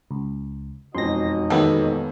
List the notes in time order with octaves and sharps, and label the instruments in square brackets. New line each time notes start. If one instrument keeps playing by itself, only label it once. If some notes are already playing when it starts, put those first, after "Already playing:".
[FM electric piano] C#2
[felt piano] E1 F2 [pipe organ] D#4 F#4 D#5 [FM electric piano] C6 A#6
[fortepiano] D#2 [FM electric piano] B3 A4